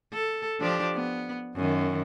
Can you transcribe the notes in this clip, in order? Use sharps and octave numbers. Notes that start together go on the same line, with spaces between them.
A4
F3 D4 G4
B3
F#2 D#3